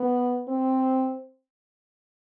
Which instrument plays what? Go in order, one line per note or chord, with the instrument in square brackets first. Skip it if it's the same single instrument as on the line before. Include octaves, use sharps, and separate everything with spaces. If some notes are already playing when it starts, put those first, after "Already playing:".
Already playing: [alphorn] B3
C4